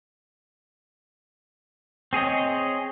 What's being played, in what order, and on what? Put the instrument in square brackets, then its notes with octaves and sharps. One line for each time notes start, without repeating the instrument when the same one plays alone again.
[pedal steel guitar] C4 G#4 C#5 D#5